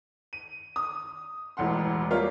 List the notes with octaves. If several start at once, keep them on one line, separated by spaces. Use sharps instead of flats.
D#7
D#6
E1 A1 E2 F#5 C6
G3 A#3 F4 A#4 C#5